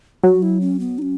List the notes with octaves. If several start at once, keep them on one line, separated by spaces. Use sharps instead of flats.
F#3 F#4
E4
C#4
B3
D#4
C#4